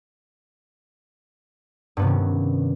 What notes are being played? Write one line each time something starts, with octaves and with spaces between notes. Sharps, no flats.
G2 C3 D#3 B3 C#4